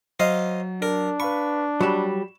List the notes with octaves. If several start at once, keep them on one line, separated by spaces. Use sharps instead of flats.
F#3 C5 D#5 F5
D4 A#4
B4 F5 B5 C#6
F#3 G3 B5 E7